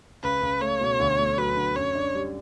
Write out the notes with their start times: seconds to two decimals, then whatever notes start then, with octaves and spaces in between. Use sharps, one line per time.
0.23 C#2 B4
0.41 C#2
0.61 A3 C#5
0.81 B2
1.00 D2
1.19 A3
1.38 F#3 B4
1.57 D3
1.76 F#2 C#5
1.95 D4
2.15 G3